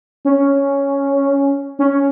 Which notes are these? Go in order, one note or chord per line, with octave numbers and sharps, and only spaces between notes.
C#4
C#4